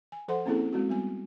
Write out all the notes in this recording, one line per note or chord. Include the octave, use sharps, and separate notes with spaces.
G#5
F3 A4 C5 F#5 C6
A#3 C4 C#4 E4 G#4 A4
G#3 C4 F#4
G3 B3 G#5